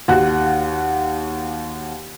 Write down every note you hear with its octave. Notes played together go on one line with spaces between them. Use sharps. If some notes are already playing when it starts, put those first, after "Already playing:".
D#2 F#4 F#5 F#6